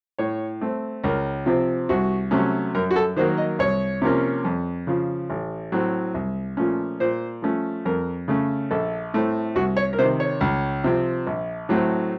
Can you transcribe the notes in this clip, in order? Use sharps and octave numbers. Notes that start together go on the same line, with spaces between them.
A2 C#5
A3 C4
C#2 A#4
C3 F3 C4
C2 F#4
C3 F#3 A3 C#4
F#2 A#4
F#4
A4
D#3 F#3 A#3 C5
D#5
C2 C#5
C3 F3 A#3 C#4
F2
C#3 F3
A1
A2 F#3 C4
C2
A#2 F3 A3 C#4
A#2 C5
F3 A3 C#4
F2 A#4
C#3 A3 C#4
A#1 A4
A2 A3 C4
C2 F#4
C#5
A#4
C3 D#3 C5
C#5
C#2
C3 F3 C4
A#1
A2 F#3 A3 C4